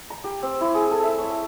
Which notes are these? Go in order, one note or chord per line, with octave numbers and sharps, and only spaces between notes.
A#5
G4
C4
E4
G#4
A4
E5
C#5